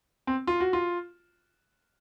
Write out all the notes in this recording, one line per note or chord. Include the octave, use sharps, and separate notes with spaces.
C4
F4
F#4
F4